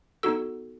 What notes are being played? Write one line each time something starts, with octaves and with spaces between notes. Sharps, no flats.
B3 D#4 F#4 A4 E6